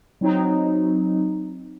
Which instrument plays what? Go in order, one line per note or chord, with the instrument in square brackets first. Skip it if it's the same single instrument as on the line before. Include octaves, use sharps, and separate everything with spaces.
[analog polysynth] F#3 C4 D#4